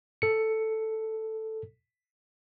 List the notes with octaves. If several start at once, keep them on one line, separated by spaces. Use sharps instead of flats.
A4 C#7